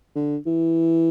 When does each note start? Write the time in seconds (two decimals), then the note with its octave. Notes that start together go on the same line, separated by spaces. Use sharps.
0.16 D3
0.46 E3